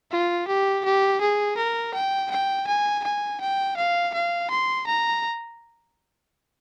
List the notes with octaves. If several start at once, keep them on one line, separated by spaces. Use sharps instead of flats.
F4
G4
G4
G#4
A#4
G5
G5
G#5
G#5
G5
F5
F5
C6
A#5